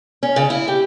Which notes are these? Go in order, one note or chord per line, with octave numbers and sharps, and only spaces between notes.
C#4
C#3
E4
G4